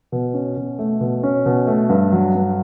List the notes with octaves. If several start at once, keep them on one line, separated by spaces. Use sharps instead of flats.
B2
C#4
B2
A3
B2
C#4
B2
A3
G2
F#3
G2